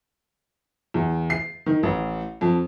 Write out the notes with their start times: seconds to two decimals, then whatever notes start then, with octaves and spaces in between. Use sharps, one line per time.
0.94 E2
1.30 C7
1.66 D#3
1.83 A1
2.41 F2